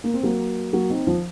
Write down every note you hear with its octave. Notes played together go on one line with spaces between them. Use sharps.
A#3
C4
F#3 A#3
F#3 A#3
C4 D#4
F3